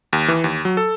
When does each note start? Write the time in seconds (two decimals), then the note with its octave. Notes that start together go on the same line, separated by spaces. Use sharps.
0.13 D#2
0.28 E3
0.44 D#2
0.65 F#3
0.77 A4